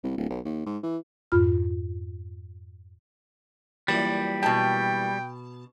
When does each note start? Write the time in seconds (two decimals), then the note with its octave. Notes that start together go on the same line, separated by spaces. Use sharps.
0.04 C2
0.17 D1
0.30 B1
0.45 D#2
0.66 G#2
0.83 E3
1.32 F2 G#2 F4 B5 F6
3.88 F#2 A#2 E3 G3
4.43 B2 G5 A5